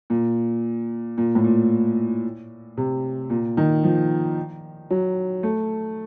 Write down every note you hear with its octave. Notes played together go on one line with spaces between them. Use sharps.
A#2
A#2
A2
A#2
C3
A#2
D#3
F3
F#3
A3